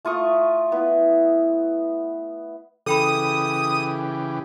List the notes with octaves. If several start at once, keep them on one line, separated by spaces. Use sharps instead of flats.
A3 F4 C#6 D#6
B3 E4
C#3 E3 G4 A4 G5 B5 D#6